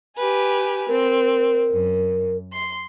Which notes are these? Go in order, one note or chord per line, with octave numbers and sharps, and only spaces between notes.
G4 B4 G#5
C4 A#4
F#2
C6